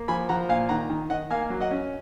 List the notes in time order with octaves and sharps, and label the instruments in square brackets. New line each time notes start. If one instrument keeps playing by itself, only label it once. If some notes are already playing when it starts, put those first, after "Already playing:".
Already playing: [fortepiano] A#3
F3 G#5 B5
F3 F#5 A#5
A#2 F5 G#5
D#3 F#5 A#5
D#3
D#3 D#5 F#5
A#3 F5 G#5
F#3
D#5 F#5
C#4